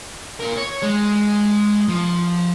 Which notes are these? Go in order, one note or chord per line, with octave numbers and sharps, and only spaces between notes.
F4 A#4
C#5
G#3
F3